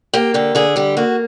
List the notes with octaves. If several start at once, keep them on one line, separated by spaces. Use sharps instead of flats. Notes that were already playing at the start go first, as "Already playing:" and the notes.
A#3 G4
D3 G4
D3 G#4
G3 G4
A#3 F#4